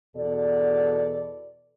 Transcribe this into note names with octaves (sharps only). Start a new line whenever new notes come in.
E2 B2 A4 D5